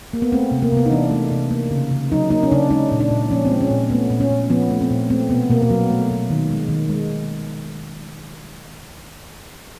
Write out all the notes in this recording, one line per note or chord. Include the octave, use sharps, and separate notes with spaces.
A#3
B3
A3 C4
C3
A#3
C3 B3
D#4
E3 D4
A3
C3
A#3
C#3
C#3
F#3 D#4
A#3 D#4
C#4
C#3 D4
G#3 D#4
A#2
D4
A#2
F3 C#4
C4
G#3
C#4
A#2
A3 B3
A#2
C#4
A#2
F3 B3
A3
C4
A#2
A3 C4
B2 B3
B2 A#3
A#3
F#3 B3
A3
B2
D#3
G#3
D#3
G#3